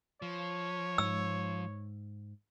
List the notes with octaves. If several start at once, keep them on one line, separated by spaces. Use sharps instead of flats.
F3 C#5
G#2 E6